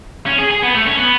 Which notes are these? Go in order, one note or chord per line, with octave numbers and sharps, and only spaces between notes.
C#4
G#4
G#4
B3
A3
C#4
B3